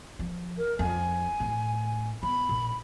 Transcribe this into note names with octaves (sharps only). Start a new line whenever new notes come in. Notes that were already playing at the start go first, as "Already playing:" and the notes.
F3
A#4
F2 G#5
A2
B3 B5
A#1